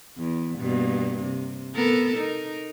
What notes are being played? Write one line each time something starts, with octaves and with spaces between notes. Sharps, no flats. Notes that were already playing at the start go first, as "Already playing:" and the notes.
E2
G2 B2 A#3
C3
B3 A4 A#4
D#4 A#4